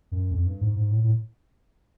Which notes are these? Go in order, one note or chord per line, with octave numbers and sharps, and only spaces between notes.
F#2
F2
G2
G#2
G#2
A2
A2